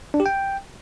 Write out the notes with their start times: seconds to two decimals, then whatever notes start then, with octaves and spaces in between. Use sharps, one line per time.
0.14 D4
0.20 G4
0.26 G5